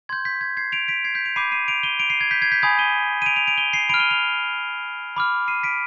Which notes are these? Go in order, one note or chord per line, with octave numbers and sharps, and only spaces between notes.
C6 G6 G#6
G6 B6
G#6
G#6 C7
D7 F7
B6 D7
G#6 C7
G6 B6
D7 F7
B5 D6 G6 C7 D#7
C7 D#7
D7 F7
D#7 G7
D7 F7
C7 D#7
G#6 C7
G6 B6
G#6 C7
G6 B6
G#5 B5 D#6 G6 G#6
D#7 G7
D#7
D7 F7
D7 F7
D7 F7
D#7 G7
C7 D#7
B5 F6 D7 F7
D#7 G7
D7 F7
B5 D6 F6
C7 D#7
B6 D7